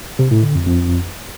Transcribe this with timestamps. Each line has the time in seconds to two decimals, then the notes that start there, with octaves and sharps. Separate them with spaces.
0.19 C3
0.31 A2
0.43 D3
0.55 F2
0.67 F2